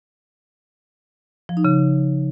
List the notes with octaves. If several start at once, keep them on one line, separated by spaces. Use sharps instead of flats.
F3
D#4
C#3